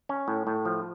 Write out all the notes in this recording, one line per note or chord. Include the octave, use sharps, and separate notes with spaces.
C#4
A2
A2
F3